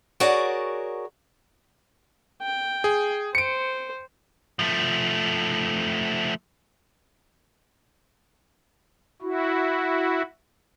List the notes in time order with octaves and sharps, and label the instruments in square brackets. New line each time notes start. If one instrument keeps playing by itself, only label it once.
[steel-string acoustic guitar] F#4 G#4 A#4 C#5 D5 F#5
[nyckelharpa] G5
[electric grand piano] G#4
[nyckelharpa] C5 [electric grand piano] C#7 D7
[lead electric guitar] F3 A3
[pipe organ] E4 F#4